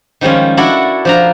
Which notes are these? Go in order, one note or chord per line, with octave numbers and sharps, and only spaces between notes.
D#3 F3 G3 G#3 C#4
D4 E4 F#4 A4 F#5
F3 D4 A#5